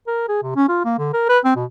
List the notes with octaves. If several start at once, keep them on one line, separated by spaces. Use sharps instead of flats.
A#4
G#4
C3
C#4
F4
A#3
D3
A#4
B4
C4
B2